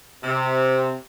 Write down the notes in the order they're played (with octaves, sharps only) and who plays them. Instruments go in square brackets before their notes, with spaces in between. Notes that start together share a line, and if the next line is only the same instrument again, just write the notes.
[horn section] C3